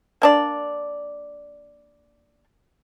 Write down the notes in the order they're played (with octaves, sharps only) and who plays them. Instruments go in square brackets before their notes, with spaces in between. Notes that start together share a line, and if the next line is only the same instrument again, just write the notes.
[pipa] A#3 D4 D5